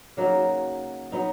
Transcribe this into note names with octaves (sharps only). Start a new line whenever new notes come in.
C#3 F#3 A#3 D#4
F#3 B3 D#4